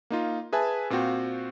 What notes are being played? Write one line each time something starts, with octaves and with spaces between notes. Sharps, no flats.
A#3 D#4 F4
G#4 B4 E5 G#5 A5
A#2 C4 F4 F#4 G5